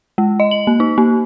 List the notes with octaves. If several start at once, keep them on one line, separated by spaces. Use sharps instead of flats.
G#3
D#5
F#7
A#3
D#4
A#3